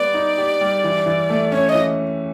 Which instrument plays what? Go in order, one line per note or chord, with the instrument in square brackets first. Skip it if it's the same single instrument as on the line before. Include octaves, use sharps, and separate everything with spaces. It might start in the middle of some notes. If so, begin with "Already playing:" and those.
Already playing: [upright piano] G3 B3 [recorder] D5
[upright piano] D#4
G4
G3
E3
E3
A3
[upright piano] C#4 [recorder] C#5
[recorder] D#5
[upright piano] E3